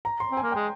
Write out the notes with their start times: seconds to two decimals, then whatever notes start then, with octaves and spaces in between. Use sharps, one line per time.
0.05 A#5
0.20 C6
0.31 C4
0.37 G#5
0.42 A#3
0.52 G#3 G5